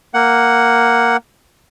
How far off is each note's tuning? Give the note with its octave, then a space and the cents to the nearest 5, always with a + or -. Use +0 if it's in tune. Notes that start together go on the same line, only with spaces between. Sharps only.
A#3 +0 F#5 +5